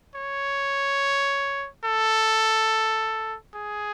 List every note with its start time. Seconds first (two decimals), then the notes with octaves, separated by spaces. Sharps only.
0.16 C#5
1.85 A4
3.54 G#4